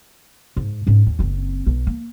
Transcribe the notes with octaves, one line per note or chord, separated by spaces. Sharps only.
G#2
G#2 C#4
D#2
F#1 C4
B1
A#3